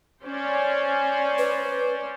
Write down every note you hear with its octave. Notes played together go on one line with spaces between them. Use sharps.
C#4 C5 D5
B4